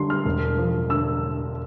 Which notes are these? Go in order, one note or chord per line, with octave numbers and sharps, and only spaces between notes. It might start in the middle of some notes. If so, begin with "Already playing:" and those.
Already playing: D3 G3 C6
F6
E1
F3
D3 E6